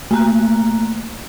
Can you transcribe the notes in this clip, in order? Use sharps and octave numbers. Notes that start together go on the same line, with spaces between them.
A3 A#3 A#5 F#6